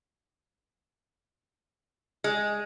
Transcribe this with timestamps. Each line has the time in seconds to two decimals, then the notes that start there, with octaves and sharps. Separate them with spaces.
2.24 G#3